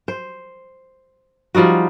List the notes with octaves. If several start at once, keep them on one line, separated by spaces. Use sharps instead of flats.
C5
F3 G3 D#4 F#4